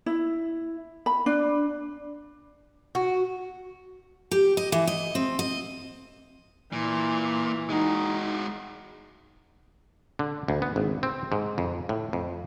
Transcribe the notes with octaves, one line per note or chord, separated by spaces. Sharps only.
E4
B5
D4
F#4
G4
D#5
E3
D#5
C4
D#5
A#2 E3
G#3 D#4 F#4
D3
D2
B3
G#1
C4
G#2
F2
A2
F2